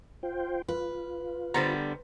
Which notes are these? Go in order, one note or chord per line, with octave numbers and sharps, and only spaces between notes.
F4 C5 G5
F4 B4
D3 G3 B3 C5 A#5